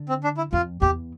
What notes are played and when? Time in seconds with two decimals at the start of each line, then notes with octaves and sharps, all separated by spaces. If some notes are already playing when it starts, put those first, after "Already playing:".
Already playing: D3
0.09 C4
0.24 D4
0.37 E4
0.53 F2 F4
0.82 E2 G4